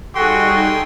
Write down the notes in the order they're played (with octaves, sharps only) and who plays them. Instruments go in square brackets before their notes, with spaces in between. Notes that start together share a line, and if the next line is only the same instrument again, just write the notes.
[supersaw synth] G3 D#4 [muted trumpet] F#4 [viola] G#4 A4 [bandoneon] G5 C6